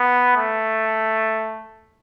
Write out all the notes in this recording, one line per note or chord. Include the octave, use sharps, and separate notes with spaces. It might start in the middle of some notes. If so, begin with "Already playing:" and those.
Already playing: B3
A3